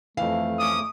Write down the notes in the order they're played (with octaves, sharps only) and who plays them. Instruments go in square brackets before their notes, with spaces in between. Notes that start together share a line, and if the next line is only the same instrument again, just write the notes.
[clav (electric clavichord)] F2 E3 [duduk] A3 [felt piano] F5
[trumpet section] C#4 D6 D#6